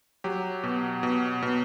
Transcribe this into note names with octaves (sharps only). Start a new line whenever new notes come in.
F#3 G4
B2
B2
B2